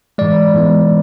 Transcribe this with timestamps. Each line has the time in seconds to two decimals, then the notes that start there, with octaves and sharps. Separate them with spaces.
0.18 G#2 E3 G#3 D5
0.54 G#2 E3 G#3 B3